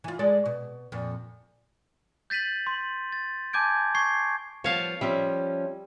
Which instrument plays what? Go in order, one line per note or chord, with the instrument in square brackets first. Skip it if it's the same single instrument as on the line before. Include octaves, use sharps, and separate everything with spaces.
[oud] E3 F4
G#3 A4 D5
B2
F2 A#2
[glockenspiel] G6 A6 B6 D#7 F#7
C6
A6
G#5 A5 D6 G6 G#6 D7
C#6 G#6 C7
[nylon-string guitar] F3 G3 B3 [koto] C#5 F5 A5
[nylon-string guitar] F3 C#4 E5 [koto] G3